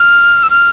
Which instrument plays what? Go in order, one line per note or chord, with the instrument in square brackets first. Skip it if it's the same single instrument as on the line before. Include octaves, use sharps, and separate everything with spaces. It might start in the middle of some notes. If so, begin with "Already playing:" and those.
Already playing: [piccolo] F6
E6
F6